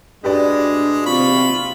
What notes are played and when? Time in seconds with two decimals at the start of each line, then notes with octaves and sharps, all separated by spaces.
0.24 A2 G#3 D4 F#4 G4 B4 D5
1.06 C3 C4 F4 B5 C#6